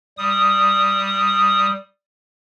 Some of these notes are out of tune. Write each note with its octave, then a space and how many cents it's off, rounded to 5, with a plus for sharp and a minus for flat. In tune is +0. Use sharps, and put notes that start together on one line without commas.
G3 -5 D#6 +0